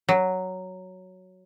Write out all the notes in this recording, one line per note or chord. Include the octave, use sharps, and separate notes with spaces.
F#3